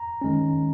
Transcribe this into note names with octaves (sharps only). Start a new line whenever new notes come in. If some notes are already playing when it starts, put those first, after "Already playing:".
Already playing: A#5
D#3 G#3 C#4